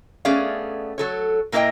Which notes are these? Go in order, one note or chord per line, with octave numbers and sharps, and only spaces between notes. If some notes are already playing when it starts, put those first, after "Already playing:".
A3 B3 C#4 G#4 D5 F5
F#3 A4 C#5
A#2 A#3 E4 A#4 D#5 G5